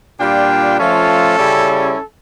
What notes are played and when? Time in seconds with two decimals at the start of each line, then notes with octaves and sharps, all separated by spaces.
0.20 A#2 G3 D4 F4 G5
0.78 F3 A3 C#4 F4 A4
1.38 C#3 G3 C#4 E4